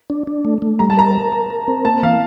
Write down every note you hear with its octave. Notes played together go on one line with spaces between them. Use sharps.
D4
D4
A3
A3
G3 A#5
A5
A#4 A#5
A#4
A#4
A#4
C4
A#3 A5
E3 F5